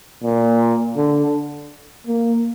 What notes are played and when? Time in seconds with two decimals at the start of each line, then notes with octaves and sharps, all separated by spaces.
0.24 A#2
0.97 D3
2.07 A#3